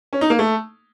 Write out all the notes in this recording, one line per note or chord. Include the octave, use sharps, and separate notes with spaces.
C#4
D#4
A#3
A3